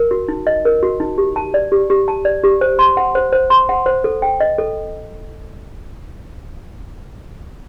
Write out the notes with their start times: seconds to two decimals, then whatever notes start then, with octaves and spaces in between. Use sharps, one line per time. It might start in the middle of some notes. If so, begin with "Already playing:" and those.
Already playing: A#4
0.11 F#4
0.28 D#4
0.47 D#5
0.65 A#4
0.83 F#4
1.00 D#4
1.18 G4
1.36 A5
1.54 D5
1.72 G4
1.90 G4
2.08 A5
2.25 D5
2.44 G4
2.61 C5
2.79 C6
2.97 F#5
3.15 C5
3.32 C5
3.50 C6
3.69 F#5
3.86 C5
4.04 A4
4.22 G5
4.40 D#5
4.58 A4